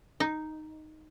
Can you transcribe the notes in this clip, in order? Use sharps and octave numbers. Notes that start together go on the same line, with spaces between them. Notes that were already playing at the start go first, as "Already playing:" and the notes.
D#4